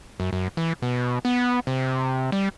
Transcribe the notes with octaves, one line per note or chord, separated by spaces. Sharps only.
F#2
F#2
E3
B2
B3
C3
G3